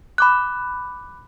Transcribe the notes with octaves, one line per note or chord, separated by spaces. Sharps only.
B5 D6 F#6